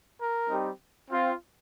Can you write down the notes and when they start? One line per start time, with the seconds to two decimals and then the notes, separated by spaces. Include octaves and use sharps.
0.18 A#4
0.48 G3 C4 D#4 G4
1.11 C4 F4